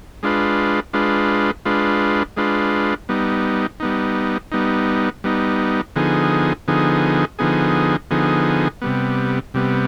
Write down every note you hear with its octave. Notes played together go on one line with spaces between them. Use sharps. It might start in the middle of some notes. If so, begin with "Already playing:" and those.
G#3 D4 F4 B4
G#3 D4 F4 B4
G#3 D4 F4 B4
G#3 D4 F4 B4
G3 B3 D#4
G3 B3 D#4
G3 B3 D#4
G3 B3 D#4
D3 F3 B3 D#4 G#4
D3 F3 B3 D#4 G#4
D3 F3 B3 D#4 G#4
D3 F3 B3 D#4 G#4
C3 G3 B3
C3 G3 B3